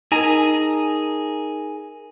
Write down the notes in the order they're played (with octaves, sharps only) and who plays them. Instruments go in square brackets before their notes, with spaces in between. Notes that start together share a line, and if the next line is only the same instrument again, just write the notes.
[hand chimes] D#4 A#4 [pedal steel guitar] G#4 G#5 A#5